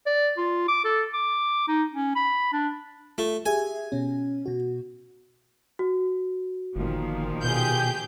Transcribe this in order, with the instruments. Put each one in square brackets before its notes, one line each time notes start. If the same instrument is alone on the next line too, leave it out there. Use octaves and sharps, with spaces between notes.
[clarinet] D5
F4
D6
A4
D6
D#4
C#4
B5
D4
[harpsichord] A3 [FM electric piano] F4
[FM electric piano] G4 G#4 E5 [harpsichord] G#5
[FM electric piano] B2 C#4
B2 F#4
[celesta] F#4
[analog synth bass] G1 [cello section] A#2 D#3 F3
[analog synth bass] B2 [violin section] G4 G#4 G6